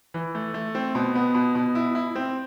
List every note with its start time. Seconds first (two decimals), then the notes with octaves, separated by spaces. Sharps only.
0.14 E3
0.35 A3
0.54 A3
0.75 C4
0.95 B2
1.15 B3
1.35 B2
1.55 B2
1.75 E4
1.95 E4
2.15 C4